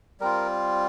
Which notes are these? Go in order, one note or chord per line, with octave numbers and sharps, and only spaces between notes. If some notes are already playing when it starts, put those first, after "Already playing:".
G3 C4 F4 A#4